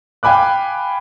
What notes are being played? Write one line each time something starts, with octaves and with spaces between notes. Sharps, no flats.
F5 G5 G#5 B5 D6 F#6